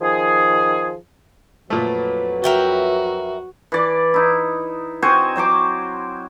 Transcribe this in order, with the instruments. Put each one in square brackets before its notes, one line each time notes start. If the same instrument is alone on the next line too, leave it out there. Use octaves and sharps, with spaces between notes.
[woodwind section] D#3 F3 G#4
[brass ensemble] F2 F#3 B4 [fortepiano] A#2 A3
[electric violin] F#4 [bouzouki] A#4 E5 G5
[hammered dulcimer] E3 D5
D#4 E4
C4 F#4 C5 G#5
F#3 C5 C6 D6